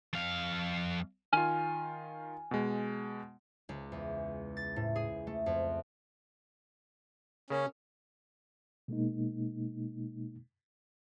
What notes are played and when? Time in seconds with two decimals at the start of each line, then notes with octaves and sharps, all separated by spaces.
0.13 F2 F5
1.33 D#3 F4 G#5 F6
2.51 B2 G#3
3.69 C#2
3.92 E2
4.57 A6
4.76 A2
4.96 G#4
5.27 A3
5.46 F2
7.50 C#3 A#3 C#4
8.88 B2 G#3 A#3 D#4